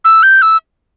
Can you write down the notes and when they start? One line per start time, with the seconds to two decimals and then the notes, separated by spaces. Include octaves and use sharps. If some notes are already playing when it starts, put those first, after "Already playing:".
0.05 E6
0.23 G6
0.42 E6